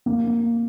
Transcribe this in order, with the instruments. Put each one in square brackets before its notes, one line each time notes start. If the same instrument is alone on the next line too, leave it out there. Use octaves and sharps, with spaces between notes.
[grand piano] A#3